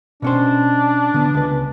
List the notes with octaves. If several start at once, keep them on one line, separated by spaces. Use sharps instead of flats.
B2 C#4 D4 C5
D3 B3
C#2 B4